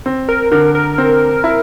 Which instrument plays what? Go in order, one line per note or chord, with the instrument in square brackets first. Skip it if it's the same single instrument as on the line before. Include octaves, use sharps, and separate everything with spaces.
[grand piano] C4
[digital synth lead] A#4
[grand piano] D3 [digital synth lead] A#4
[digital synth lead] A#4
[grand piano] C4
E4